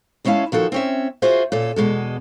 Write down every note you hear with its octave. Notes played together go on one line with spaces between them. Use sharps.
D2 G#3 C#4 E4 F5 A5
D#3 F3 F#4 A4
C4 C#4 E5
F4 F#4 G#4 C5 E5
A#2 C#4 A4
E2 B2 G#3 A4